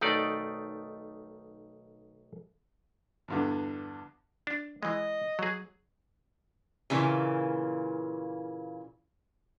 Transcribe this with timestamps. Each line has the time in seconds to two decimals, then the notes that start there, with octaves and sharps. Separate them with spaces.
0.01 B1 D#3 A3 D#4 D5
3.28 E2 G2 D3
4.47 D4
4.83 E3 G#3 D#5
5.39 F#3 G#4
6.90 A#2 C#3 E3 G3 A#3